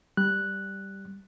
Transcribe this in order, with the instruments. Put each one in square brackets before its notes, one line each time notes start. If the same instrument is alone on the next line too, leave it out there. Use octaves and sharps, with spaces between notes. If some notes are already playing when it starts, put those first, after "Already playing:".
[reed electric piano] G3 F#6